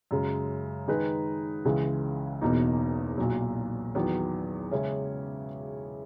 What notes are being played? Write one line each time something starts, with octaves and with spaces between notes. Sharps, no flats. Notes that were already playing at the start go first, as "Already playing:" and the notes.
F#2 C#3 G#3
D#3 G#3 D#4 G#4 B4
C#2 C#3 E3 G#3
E1 E2 B2 A#3 D#4
B1 A#2 F#3
E2 D#3 F#3 B3
C#3 G#3 C#4 E4